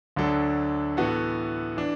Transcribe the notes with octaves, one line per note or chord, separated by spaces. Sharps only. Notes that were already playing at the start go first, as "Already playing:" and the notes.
D2 D3 F#3 D4 A4
A2 E3 B3 F#4 A4
E3 D4